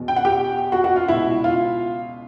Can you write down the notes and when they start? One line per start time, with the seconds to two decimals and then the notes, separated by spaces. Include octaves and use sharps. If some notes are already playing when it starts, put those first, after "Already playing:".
Already playing: E2 B2
0.08 G5
0.16 F#5
0.25 G4 G5
0.72 F#4 F#5
0.84 F#4 F#5
0.96 F4 F5
1.08 C#2 B2 E4 E5
1.44 F4 F5